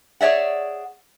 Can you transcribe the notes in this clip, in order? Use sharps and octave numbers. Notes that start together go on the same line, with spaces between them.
G#4 C#5 D5 E5 F#5